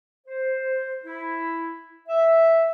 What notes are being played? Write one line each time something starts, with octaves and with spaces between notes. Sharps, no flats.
C5
E4
E5